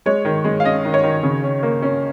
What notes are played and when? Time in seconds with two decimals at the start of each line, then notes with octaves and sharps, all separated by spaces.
0.06 G#3 C#5
0.25 D#3
0.44 G#3
0.60 F5
0.64 C#4 D#5
0.85 D#3
0.94 C#5
1.03 D#3
1.23 C#3
1.43 C#4
1.63 A#3
1.82 C#4